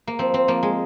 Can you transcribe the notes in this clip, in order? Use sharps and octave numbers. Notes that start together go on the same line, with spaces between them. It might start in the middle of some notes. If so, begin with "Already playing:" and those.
A#3
F3 C4
C4
F3 A#3
G#3